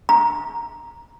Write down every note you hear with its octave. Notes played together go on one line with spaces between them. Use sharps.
A#5